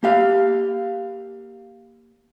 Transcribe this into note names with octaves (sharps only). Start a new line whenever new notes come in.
A#3 G4 F5